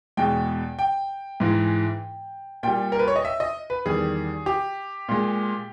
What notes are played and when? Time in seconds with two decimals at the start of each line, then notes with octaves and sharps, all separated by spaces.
0.17 E2 B2 G#3 G5
0.79 G5
1.40 G#2 E3 G#3
2.63 A#2 G3 G5
2.92 A#4
2.99 B4
3.08 C#5
3.16 D#5
3.25 E5
3.40 D#5
3.70 B4
3.85 E2 D#3 G3 G#4
4.46 G4
5.09 A#2 G#3